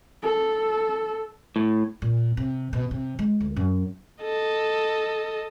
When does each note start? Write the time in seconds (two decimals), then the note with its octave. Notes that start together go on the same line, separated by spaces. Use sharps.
0.23 A4
1.56 A2
2.02 A#2
2.37 C3
2.73 B2
2.91 C3
3.19 G#3
3.40 D2
3.56 F#2
4.23 A4 D#5